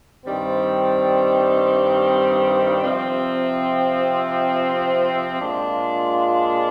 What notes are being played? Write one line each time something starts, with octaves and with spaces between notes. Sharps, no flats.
G2 D#3 G3 C4
C3 F3 C4
A#2 G#3 D4 F4